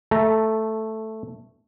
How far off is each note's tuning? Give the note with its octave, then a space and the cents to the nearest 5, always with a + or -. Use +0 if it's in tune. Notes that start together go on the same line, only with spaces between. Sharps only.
A3 +0 A4 -15 A#5 +0